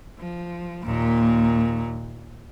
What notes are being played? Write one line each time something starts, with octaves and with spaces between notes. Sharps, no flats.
F3
D#2 A#2